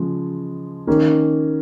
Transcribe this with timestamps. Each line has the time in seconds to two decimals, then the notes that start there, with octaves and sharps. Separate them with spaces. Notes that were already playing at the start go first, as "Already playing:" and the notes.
Already playing: C#3 F3 G#3
0.87 D#3 A#3 C#4